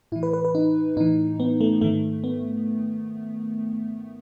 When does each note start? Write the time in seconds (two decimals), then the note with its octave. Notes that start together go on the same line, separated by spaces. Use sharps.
0.12 A2 E4
0.16 E3
0.23 B4
0.33 B4
0.45 B4
0.55 D#4
0.97 A2 E3 D#4
1.40 B3
1.61 A3
1.81 G#2 D#3 A3
2.24 B3